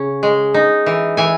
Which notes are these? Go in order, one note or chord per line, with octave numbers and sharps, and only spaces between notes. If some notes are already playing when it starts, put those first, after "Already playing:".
Already playing: C#3 C#4
G#3
D#4
E3
E3 G#5